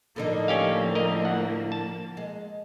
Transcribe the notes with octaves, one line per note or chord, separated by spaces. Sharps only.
A2 D3 F3 A#3 D#4
C#4 G4 F5
A#4 D#5
F#5
A5
G#3